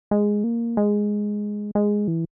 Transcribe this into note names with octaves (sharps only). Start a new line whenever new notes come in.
G#3
A#3
G#3
G#3
E3